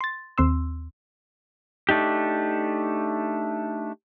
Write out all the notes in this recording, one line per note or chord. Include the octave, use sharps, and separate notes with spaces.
C6 A6
D#2 C4 C6 E6
A3 D4 D#4 G4